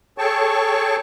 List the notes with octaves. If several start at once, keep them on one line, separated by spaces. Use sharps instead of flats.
G#4 A4 C#5 G5 A5 C#6